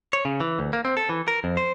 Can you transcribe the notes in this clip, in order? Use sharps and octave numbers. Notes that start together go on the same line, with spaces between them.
C#5
C#3
E3
D2
A#3
C4
A4
E3
A#4
F2
C5